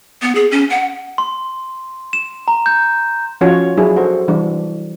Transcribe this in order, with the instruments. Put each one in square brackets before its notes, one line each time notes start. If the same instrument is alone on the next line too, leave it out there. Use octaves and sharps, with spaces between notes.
[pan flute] B3
G#4
C#4
F#5
[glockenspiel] C6
E7
A#5
G6
[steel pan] F3 C#4 F4 F#4 C#5
F#3 D4 E4 G#4
F#4 A4 C5
E3 G3 D4